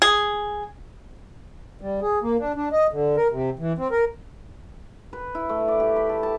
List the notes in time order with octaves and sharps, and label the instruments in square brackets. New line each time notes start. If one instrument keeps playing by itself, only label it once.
[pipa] G#4
[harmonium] G3
G#4
A#3
D4
D4
D#5
D3
A#4
C3
E3
C4
A#4
[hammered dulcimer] B4
E4
A3
D5
G4
B5
A4
A5